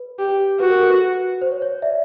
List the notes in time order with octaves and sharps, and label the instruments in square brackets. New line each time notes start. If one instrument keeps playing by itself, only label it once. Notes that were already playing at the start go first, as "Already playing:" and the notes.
Already playing: [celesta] B4
[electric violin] G4
[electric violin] F#4 [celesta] B4
[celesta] A#4
A4
B4
C5
C#5
C#5
D5 E5